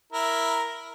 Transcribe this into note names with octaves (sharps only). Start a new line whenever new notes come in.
E4 A#4